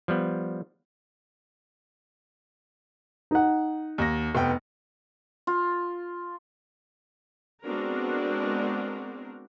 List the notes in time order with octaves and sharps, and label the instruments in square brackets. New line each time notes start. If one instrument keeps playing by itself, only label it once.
[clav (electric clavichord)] F3 G3 B3
[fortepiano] D#4 F#5
[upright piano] D#2 A#6
F1 B3 G5
[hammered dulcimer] F4
[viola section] G#3 B3 C4 D4 F#4 A#4